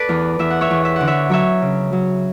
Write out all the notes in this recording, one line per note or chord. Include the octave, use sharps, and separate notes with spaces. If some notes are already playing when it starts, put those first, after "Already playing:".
Already playing: A4 B4 D5
E2
E2 E5
F#5
C#5 E5
E2
E5
D3 F#5
C#5 E5
F#3 C#5 E5
C#3
F#3